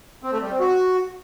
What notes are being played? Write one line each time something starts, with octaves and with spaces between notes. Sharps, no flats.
C4
A3
G3
C4
F#4